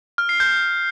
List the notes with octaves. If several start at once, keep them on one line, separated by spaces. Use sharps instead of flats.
F6
C7
G6